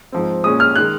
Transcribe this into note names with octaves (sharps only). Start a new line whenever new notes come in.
G#2 F3 C4
A#2 G#3 C#4 D#6
F6
D#3 G#3 F#6